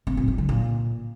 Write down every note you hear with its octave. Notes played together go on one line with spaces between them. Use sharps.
C4
A#2
F#3
D3
A#2